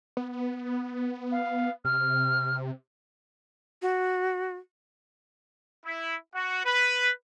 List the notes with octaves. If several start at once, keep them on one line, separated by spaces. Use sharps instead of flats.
B3
F5
C3 F6
F#4
E4
F#4
B4